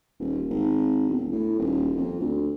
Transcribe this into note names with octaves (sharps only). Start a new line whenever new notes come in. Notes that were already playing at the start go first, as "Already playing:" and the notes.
D#1
G#1
E1
A2
D#1
F2
D2